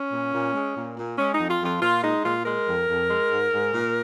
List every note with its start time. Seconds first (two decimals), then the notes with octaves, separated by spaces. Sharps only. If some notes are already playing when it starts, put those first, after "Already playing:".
Already playing: C#4
0.12 A#2
0.33 A#2
0.54 G#3
0.76 A#2
0.97 A#2
1.18 G#3 C#4
1.35 F2 D#4
1.50 F4
1.61 F2 F4
1.82 A#2 F4
2.03 G#3 D#4
2.25 A#2 F4
2.45 G#3 A#4
2.67 F2
2.89 F2
3.10 G#3
3.31 G#2
3.52 G#2
3.74 A#2